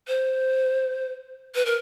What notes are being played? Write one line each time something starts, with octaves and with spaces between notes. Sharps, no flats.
C5
B4
A#4